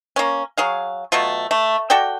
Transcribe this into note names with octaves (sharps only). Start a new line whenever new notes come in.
A#3 C#4
F#3 G#4 F5
B2 F#3 A3 F4
A3
F#4 A4 D5 G5